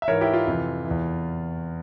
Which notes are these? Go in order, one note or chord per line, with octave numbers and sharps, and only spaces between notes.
E5
G#2 E3 A#4 C#5
E4 G4
F4
F2 C3 E3
E2 E3